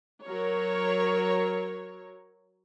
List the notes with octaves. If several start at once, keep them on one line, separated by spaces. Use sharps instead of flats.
F#3 A#4 C#5